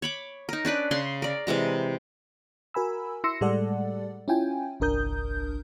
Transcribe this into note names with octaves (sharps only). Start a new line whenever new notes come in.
C#5 B5 D6
D#4 A#4
C#4 D4 B4 D5
C#3 G#4 C6
A#4 D5
C3 E3 G#3 A#5
F#4 A#4 G#5 B5 E6
E4 C6 E6 A#6 C#7
A2 G3 G#3 A4 D5 F#5
C#4 E4 F4 G5 G#5
G1 C2 D4 A#4 D#6 G6